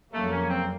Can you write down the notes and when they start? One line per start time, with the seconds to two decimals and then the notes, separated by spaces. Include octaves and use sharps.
0.12 F2 C#3 F#3 A3 A#3
0.31 C#4
0.48 C4